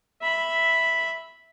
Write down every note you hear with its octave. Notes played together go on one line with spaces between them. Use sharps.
E5 B5